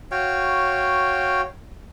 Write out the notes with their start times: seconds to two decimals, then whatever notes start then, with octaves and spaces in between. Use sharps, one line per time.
0.11 F#4 C#5 F5 G5